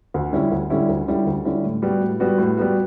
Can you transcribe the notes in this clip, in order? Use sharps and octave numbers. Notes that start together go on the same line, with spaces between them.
D2
D3 G3 C#4 E4
D2
D3 G3 C#4 E4
D2
D3 G3 C#4 E4
D2
D3 G3 C#4 E4
A2
G3 B3 F#4
A2
G3 B3 F#4
A2
G3 B3 F#4